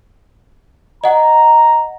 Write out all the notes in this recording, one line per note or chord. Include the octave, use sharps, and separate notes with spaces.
D#5 F#5 A#5